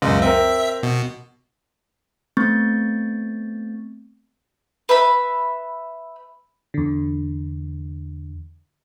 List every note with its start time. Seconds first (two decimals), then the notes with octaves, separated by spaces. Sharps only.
0.02 C#2 F#2 C#3
0.22 C4 A#4 E5
0.83 B2
2.37 A3 B3 C4 C#6 G6 A6
4.89 B4 E5 B5
6.74 E2 D3